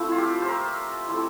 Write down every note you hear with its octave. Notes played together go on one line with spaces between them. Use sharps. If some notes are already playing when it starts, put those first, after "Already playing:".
Already playing: F3 A3 C4 E4
F4
G4
C5
A#4
A3 C4 E4